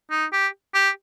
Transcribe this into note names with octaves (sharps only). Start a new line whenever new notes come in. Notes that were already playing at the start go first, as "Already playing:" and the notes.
D#4
G4
G4